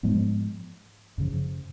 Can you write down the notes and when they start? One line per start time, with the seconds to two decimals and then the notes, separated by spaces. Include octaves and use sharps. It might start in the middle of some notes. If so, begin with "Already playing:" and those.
0.03 G#2 F3 G#3 B3
1.18 F#2 C#3 F3